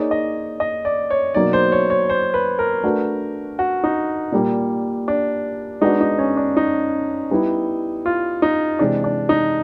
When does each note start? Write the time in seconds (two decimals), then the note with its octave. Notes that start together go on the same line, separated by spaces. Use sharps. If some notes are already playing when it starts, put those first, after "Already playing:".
Already playing: A#3 D#4 G#4 C#5 D5
0.11 D#5
0.60 D#5
0.85 D5
1.10 C#5
1.34 B2 F#3 A#3 D#4 D5
1.53 C5
1.72 C#5
1.90 C#5
2.10 C5
2.34 B4
2.59 A#4
2.83 A3 D4 F#4 B4
3.59 F#4
3.84 D#4
4.32 A#2 G3 A#3
5.08 D4
5.81 G#3 B3 D4 D#4 F#4
6.01 D#4
6.18 C#4
6.37 D4
6.57 D#4
7.31 G3 B3 E4
8.06 F4
8.42 D#4
8.79 C3 E3 G#3 D4
9.04 D4
9.29 D#4